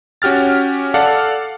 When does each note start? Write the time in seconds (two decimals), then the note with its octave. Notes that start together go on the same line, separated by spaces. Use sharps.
0.22 C#4 F#4 G4 F6 A6
0.94 A4 D5 F5 F#5